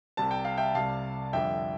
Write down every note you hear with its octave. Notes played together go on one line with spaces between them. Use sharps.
C2 C3 G3 A5
G5
F5
E5 G5
C2 C3 G3 F5 A5
F2 D3 G3 E5 G5